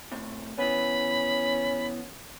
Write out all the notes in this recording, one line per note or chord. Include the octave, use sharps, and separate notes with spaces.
A2 C3
E3 B3 C#4 B5